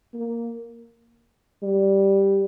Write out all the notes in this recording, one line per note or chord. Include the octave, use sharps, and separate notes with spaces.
A#3
G3